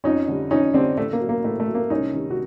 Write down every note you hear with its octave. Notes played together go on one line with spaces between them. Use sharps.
F2 C#4 D#4
D3 G3
F2 C#4 D#4
D3 G3 C4 D4
A2 A3
A#3
F#3
A#3
A2 A3
A3
F#3
A#3
C2 C#4 D#4
C3 D#3
F#4